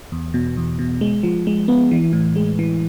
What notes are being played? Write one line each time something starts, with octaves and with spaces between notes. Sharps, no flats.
E2
B2
E2
B2
G#3
F3
G#3
B3
E3
A2
G#3
E3